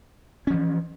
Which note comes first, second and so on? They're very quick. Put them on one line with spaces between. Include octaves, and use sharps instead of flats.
C#4 F3 E3